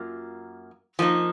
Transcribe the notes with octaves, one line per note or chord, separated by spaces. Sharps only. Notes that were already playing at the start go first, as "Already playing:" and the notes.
Already playing: F#2 A#3 F4
F3 A#3 D#4